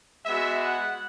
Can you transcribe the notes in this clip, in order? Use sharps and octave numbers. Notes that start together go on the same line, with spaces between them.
G#3 B3 F#4 E5
F#5